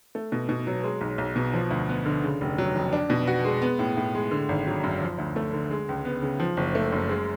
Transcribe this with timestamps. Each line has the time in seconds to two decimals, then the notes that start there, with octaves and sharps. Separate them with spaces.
0.15 A3
0.32 B2
0.49 B2
0.67 F#3
0.84 G#3
1.01 B1
1.18 B1
1.36 B2
1.53 F3
1.71 D2
1.89 B3
2.06 D3
2.24 C#3
2.41 F1
2.58 F#3
2.75 F2
2.93 D4
3.10 B2
3.27 F#4
3.45 G#3
3.62 B3
3.79 A2
3.97 A2
4.15 G#3
4.31 D3
4.49 G#1
4.67 F#3
4.84 F#2
5.02 F3
5.18 D2
5.36 A3
5.54 D3
5.71 G#3
5.89 C#2
6.05 B3
6.22 C#3
6.40 F3
6.57 F#1
6.75 A3
6.92 F#2
7.09 G#3